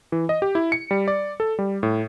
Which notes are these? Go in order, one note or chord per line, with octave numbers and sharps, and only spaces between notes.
E3
D#5
G4
E4
C#7
G3
D5
A4
G3
A2